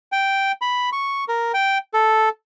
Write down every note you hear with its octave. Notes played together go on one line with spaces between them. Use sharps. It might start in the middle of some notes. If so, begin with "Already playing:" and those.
G5
B5
C#6
A#4
G5
A4